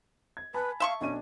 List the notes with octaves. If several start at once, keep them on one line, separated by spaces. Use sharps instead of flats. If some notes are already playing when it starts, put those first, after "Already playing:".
G#6
B4 G#5 A5 B5
E5 F5 A5 C6 C#6
B1 C#4 D4 D#7